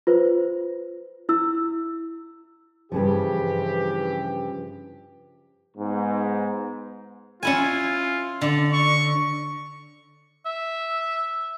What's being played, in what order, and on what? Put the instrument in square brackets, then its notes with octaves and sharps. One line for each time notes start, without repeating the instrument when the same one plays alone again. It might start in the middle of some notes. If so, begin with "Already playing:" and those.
[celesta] F4 B4 C5
E4 E6
[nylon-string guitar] G2 C#3 F3 [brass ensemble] E3 G4
[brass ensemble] G#2 B3
[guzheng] C#4 E4 G#5 [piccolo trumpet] F4
[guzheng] D3
[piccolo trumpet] C#6
[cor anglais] E5